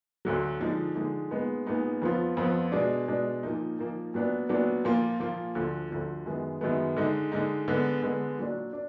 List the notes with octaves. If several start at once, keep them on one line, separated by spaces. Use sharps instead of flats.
D2 D3 F#3
D3 F3 G#3 D#4
D3 F3 G#3 D#4
A#2 G#3 B3 D#4
A#2 G#3 B3 D#4
F2 F3 B3 F4
F2 F3 B3 F4
B2 G#3 D4
B2 G#3 D4
A#2 F3 A#3 D#4
A#2 F3 A#3 D#4
A#2 F#3 B3 D4
A#2 F#3 B3 D4
A#2 F3 A#3 F4
A#2 F3 A#3 F4
D2 D3 F3
D2 D3 F3
F#2 D#3 G#3 B3
F#2 D#3 G#3 B3
D3 G#3 D#4
D3 G#3 D#4
D3 G#3 B3
D3 G#3 B3
A#2 F#3 D4
D4